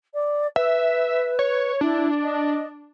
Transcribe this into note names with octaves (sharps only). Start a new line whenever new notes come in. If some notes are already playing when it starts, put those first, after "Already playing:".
D5
B4 E5
C#5
D4 E4
D#5